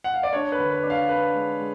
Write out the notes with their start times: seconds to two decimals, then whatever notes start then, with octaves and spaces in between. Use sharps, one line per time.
0.04 F#5
0.14 F5
0.23 D5
0.33 D4 C#5
0.52 B4
0.58 D3
0.71 B4
0.83 D4
0.90 F5
1.08 D4 B4
1.34 G#3
1.59 G#3